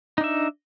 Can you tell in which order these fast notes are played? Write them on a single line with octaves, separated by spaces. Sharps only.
D#4 D4 E5